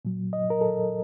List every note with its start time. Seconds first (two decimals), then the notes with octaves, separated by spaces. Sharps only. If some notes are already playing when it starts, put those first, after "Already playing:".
0.05 A#2 F#3
0.33 D#5
0.50 A#4
0.61 A4